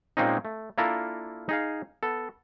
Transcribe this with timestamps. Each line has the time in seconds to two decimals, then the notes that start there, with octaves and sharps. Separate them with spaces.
0.17 A#2 G#3 A#3 C4 C#4 D#4
0.45 A3
0.78 A#3 D4 E4 F4 A4 A#4
1.49 D#4 G#4 F5
2.03 B3 A4